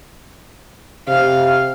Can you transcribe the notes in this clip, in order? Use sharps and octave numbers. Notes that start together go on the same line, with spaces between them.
C3 F5